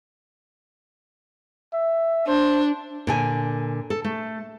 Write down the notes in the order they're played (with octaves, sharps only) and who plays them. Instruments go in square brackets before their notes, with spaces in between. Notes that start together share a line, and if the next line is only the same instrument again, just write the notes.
[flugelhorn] E5
[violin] D4 [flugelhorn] C5
[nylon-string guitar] A#2 D3 G#5
A4
A3